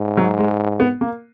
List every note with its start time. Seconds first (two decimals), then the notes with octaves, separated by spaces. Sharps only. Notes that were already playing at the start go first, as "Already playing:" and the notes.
Already playing: G#2
0.17 F#3
0.39 G#3
0.80 B3
1.01 A#3